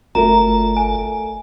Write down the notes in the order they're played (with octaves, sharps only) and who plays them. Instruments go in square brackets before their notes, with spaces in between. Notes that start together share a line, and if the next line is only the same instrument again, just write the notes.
[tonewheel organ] G1 A4 [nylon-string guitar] A3 F4 A#4 [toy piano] A#5
[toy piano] G#5